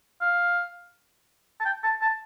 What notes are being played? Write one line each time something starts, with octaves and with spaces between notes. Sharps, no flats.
F5
A5
G5
A5
A5